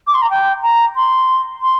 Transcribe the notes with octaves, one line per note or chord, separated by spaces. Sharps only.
D6
C6
A#5
G5
A#5
C6
C6